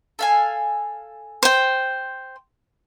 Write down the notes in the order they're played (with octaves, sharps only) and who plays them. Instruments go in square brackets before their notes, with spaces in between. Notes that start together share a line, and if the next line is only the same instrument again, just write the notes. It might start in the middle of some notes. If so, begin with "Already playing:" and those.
[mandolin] A4 F5 G#5
[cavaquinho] C5 G5